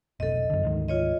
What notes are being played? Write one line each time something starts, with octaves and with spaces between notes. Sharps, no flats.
F1 B1 A4 D#5
F#2 D3
D2 G#2 D#3
F4 C#5 D#5